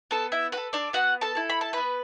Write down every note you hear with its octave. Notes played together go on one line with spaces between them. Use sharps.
B3 A4 A5
E4 E5
F#4 A4 B4
D4 D5
B3 F#4 F#5
A4 A5
E4 A4
B5
A5
B3 B4 B5